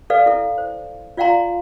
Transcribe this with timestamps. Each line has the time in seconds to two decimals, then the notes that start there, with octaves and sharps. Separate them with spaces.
0.10 A4 B4 D5 F5
0.26 E4 A4
0.58 C5
1.17 F4 D5 F5 G5 A#5 C6